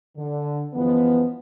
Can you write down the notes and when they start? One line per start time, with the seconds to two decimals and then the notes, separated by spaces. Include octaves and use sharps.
0.17 D3
0.73 F#2 E3 F3 G#3 B3